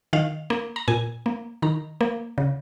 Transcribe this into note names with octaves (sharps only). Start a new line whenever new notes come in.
D#3 F5
A#3
A#5
A#2 G#5
A#3
D#3 A#5
A#3
C#3